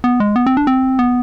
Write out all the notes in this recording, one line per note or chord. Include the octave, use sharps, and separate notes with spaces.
B3
G#3
B3
C4
D4
C4
B3